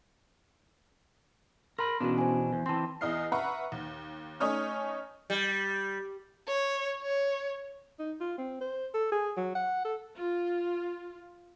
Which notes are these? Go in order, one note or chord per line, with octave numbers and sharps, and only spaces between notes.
A#4 B5 C6
E2 B2 B3 C#4 D4 F#4
C5 G#5
E2
E3 C4 A5 C6
E2 E4 D#5 F6 C7
B4 E5 F#5 A#5 B5 C#6
D#2
A3 C#4 D#4 C#5 D#6 F6
G3
C#5
C#5
D#4
F4
C4
C5
A4
G#4
F#3
F#5
A4
F4